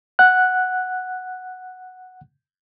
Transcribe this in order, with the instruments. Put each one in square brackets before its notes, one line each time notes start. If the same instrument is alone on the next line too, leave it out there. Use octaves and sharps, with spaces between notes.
[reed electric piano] F#5 F#6